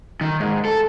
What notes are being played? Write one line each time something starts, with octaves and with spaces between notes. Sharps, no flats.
D#3
G#2
A4